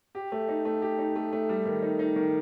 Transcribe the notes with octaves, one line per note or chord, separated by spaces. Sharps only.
G4
A3
D#4
A3
G4
D#4
A3
A3
G3
D#3
D#4
D#4
D#3